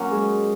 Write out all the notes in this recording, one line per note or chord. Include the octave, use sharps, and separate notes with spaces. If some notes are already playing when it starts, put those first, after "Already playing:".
Already playing: F#3 A#3 C#4 F#4
G#3